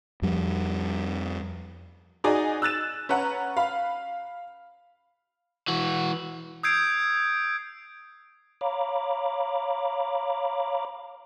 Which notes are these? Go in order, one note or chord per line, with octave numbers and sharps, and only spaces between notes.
F2 F3 G3
D#4 F#4 G#4 D5 D#5 G#5
E6 F#6 A6 E7
C#4 B4 F#5 A#5
F5 B5
E3 F#4
D#6 E6 G6 G#6 C7 D7
C#5 F5 A#5 B5 D6